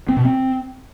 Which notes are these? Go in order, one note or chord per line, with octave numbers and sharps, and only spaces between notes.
C4
B2
C4